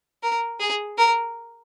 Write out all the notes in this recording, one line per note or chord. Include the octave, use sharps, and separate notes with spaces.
A#4
G#4
A#4